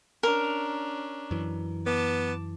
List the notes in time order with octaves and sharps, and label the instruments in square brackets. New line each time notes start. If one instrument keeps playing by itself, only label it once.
[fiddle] C#4 D4 [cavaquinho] A#4
[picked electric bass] F#2 E3
[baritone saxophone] B3 [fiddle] A5 D6